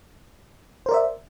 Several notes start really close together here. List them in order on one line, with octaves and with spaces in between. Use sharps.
C5 A#4 D5 E5